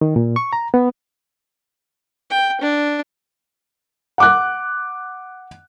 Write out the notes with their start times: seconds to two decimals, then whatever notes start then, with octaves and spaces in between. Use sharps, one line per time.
0.01 D#3
0.16 A#2
0.36 C#6
0.53 A#5
0.74 B3
2.30 G5
2.61 D4
4.18 F#5 D6 F#6